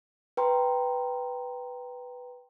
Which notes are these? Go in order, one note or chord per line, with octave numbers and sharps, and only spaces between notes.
B4 G5 A#5 C6